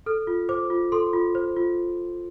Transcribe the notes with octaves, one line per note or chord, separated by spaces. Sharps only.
A4 F6
F4
C5 D6
F4
A4 C6
F4
C5
F4